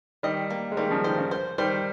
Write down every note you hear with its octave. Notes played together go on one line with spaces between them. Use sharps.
D#3 G3 D#5
A#3
G#3
D#3 G3 A#3
C#3 F3
D#3 C5
C#3
C5
D#3 G3 C5